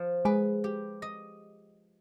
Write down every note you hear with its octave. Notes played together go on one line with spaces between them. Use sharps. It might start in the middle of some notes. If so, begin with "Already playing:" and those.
Already playing: F3
G#3 G#4 B4
G4
D#5